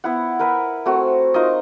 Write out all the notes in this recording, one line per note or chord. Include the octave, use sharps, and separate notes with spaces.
B3 E4 F#5
A#4 B4 E5
A3 C4 F#4
D#4 F4 A#4 D#5